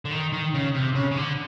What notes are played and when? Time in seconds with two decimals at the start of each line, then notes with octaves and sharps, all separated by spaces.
0.05 D3
0.11 D#3
0.33 D#3
0.54 C#3
0.74 C3
0.95 C#3
1.11 C#3
1.17 D3